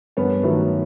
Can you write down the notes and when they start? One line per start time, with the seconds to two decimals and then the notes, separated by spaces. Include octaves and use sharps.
0.17 G2 B3 C#4
0.43 D#3 F#3 A3 B3